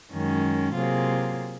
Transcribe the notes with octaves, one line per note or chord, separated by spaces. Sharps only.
F#2 D#3 G#3 C#4
C3 F#3 A#3 F4 G#4